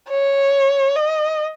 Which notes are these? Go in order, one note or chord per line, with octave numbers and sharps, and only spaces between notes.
C#5
D#5